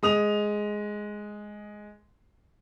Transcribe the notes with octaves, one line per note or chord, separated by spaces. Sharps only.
G#3 D#6 F7